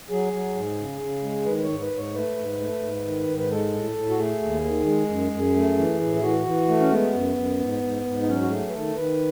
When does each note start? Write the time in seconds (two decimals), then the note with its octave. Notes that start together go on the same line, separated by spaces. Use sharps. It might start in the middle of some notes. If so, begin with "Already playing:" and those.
0.10 F#3 G#4
0.33 F#3
0.55 G#2
0.78 C#3
1.01 C#3
1.23 G#3
1.46 D#3 B4
1.57 B4
1.63 C#5
1.69 G#2
1.81 B4
1.92 G#2
1.97 C#5
2.14 A3 B4
2.37 G#2
2.60 A3
2.83 G#2
3.05 D#3
3.28 G#2
3.39 B4
3.50 G#3 A4
3.73 A2
3.96 A2
4.10 F#4
4.19 A3 G#4
4.42 D#2
4.64 D#3
4.86 G#3
5.09 F#2
5.32 F#2
5.55 A3
5.78 E3
6.01 A2
6.15 E4
6.22 E3 F#4
6.46 E3
6.68 A3
6.80 C#4
6.91 G#3 B3
7.14 F#2
7.36 F#2
7.60 G#2
7.83 G#2
8.05 G#2
8.22 D#4
8.28 F#3 C#4
8.42 F#4
8.50 A3 G#4
8.69 B4
8.72 D#3 A4
8.96 D#3 B4